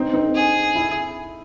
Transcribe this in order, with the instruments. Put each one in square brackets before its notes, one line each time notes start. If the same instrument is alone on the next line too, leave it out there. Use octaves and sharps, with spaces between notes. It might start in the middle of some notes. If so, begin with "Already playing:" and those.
Already playing: [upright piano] C4 D#4
C4 D#4
[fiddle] G#4
[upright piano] E4